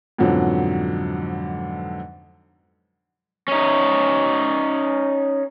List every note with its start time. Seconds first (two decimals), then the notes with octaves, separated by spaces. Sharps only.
0.18 F2 G#2 B2 D3 F3 F#3
3.48 C#4 D#4